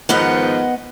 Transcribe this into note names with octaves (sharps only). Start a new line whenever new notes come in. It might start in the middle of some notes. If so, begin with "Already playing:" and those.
G#2 D#3 F3 B3 D#5 F#5